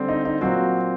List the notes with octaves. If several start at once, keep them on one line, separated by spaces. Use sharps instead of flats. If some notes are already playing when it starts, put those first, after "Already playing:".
Already playing: D3 G3 C4
D#4
D#4
A#2 F#3 C4 F#4